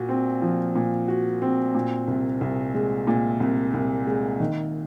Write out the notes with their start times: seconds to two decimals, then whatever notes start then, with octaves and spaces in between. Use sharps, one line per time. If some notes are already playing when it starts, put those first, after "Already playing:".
Already playing: A#2 F#4
0.09 C4
0.42 F3
0.75 A#2
1.08 F#4
1.42 C4
1.75 A#2
2.08 C2
2.41 C2
2.74 G#3
3.07 A#2
3.40 C2
3.74 C2
4.07 G#3
4.40 D#3